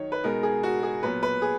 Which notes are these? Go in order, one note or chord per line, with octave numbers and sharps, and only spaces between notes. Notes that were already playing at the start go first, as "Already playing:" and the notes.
Already playing: D#3 F#3 D#4 C#5
B4
B2 G#3 B3 D#4 A#4
G#4
F#4
G#4
A#2 F#3 B3 B4
B4
G#4